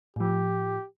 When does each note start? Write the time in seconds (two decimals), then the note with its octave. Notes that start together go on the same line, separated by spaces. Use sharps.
0.16 A2 F3 G4